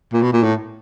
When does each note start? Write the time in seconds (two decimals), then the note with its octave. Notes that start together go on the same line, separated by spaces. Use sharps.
0.13 A#2
0.22 B2
0.33 A#2
0.43 A2